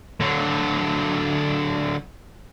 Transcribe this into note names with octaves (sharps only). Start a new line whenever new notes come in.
D3 F#3